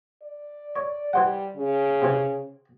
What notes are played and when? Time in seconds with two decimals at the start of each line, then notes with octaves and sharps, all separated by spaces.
0.22 D5
0.76 C#5
1.13 E3 G3 C5 F#5
1.56 C#3
2.02 C3 E3